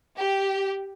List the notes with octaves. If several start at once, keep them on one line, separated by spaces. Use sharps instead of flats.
G4